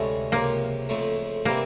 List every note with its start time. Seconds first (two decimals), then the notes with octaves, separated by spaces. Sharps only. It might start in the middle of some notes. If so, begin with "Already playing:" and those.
Already playing: D2 C3 E3 G#3 A3 C#4
0.32 C#2 C3 F3 A#3
0.89 F2 C#3 F3 A3
1.45 C3 E3 G3 A#3 C4